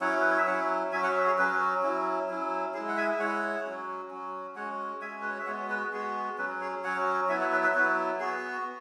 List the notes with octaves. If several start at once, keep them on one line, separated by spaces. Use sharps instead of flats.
F#3 C#4 E4 C#5 F#5
B4
C#5
E5
F#3 C#4 E4 C#5 F#5
F#3 C#4 F#4 E5 G#5
C#5 F#5
E5
G#4 C#5
F#3 C#4 F#4 B4
F#4
F#3 C#4 E4
F#3 C#4 E4
G#3 E4 G#4
F#5
E5 G#5
G#3 E4 C#5 F#5
F#3 C#4 F#4
F#3 C#4 F#4
G#3 C#4 F#4 C#5 F#5
G#3 C#4 F#4 E5 G#5
B4
C#5
E5
G#3 B3 F#4 C#5 F#5
F#4 B4
F#4
G#3 B3 F#4 G#4
F#3 C#4 F#4 B4
G#4 C#5
F#3 C#4 F#4 C#5 F#5
F#3 B3 E4 E5 G#5
C#5 F#5
B4 E5
B4 E5
F#3 B3 E4 F#4 B4
B3 F#4 G#4